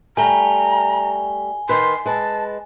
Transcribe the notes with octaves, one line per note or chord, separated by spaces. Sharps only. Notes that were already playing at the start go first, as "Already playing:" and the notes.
G3 A3 G#5 A#5 G7
D#3 B4 C6
G#3 B4 A5